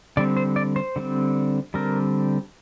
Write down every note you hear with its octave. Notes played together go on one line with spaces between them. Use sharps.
D3 G3 C4 D5
C5
D5
C5
D3 G3 C4
D3 G3 C4 A#4